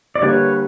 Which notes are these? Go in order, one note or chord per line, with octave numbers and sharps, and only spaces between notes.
D5
D3 G3 A#3 B4 C#5